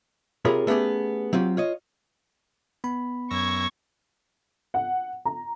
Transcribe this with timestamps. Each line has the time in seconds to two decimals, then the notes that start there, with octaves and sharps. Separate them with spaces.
0.45 C3 F4 G#4 A#4 C#5 B5
0.67 A3 B3 C#4 G4 G#4
1.33 F#3 C4 F4 G4
1.57 F4 C#5 D#5
2.84 B3 B5
3.31 F#2 C#6 E6 G#6 A#6
4.74 F#5
5.25 A#5